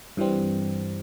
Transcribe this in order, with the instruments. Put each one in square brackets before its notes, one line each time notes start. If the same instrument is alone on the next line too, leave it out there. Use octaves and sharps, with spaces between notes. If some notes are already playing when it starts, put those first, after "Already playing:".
[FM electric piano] G2 E3 G3 C4